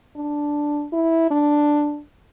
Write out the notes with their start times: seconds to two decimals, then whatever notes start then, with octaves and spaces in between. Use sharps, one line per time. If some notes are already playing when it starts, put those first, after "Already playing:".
0.16 D4
0.93 E4
1.31 D4